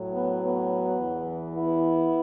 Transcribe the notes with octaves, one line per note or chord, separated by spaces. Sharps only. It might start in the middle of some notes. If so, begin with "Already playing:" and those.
Already playing: A2 F#3
B3
B3
E2 E3
B3 E4